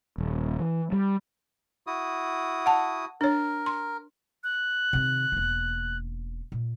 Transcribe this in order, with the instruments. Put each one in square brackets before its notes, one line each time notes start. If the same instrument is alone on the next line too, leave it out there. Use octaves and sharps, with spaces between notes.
[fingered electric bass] D#1
E3
G3
[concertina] E4 F#4 D#6
[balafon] F#5 A5
[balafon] D4 C#5 [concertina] A#4
[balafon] C6
[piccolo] F#6
[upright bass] C3 D#3
E1 A#3
A#2